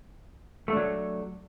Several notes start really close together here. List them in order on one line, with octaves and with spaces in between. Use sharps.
A3 D4 F#3